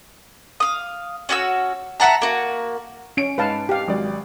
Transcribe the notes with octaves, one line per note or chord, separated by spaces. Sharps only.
F5 D#6
C#4 F#4 G#5 E6
E5 F#5 A5 A#5
A#3 F#4
C#4 C#7 D7
G#2 B4 F5 A5
G4 F5
G#1 F#3 D5